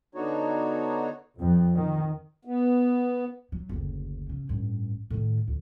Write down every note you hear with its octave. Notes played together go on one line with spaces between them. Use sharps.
D3 B3 D4 D#4 F#4 C#5
F2
D#3
B3
F#3
F#1 D2
C#3
A1 G2
A2 D#3
D2